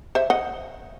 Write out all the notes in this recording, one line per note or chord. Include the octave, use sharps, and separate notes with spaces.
C5 E5
D#5 F#5